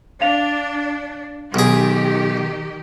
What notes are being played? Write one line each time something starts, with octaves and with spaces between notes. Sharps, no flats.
D4 F5 F7
B1 D#3 G4 G#4